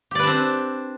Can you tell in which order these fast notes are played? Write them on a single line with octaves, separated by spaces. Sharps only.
G4 D5 B4 D4 C4